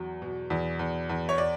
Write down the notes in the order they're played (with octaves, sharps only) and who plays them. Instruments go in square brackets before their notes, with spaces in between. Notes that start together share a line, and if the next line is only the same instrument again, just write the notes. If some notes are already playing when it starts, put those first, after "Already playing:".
Already playing: [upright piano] E2 F#3
B2
E2
E2
E2
C#5
D5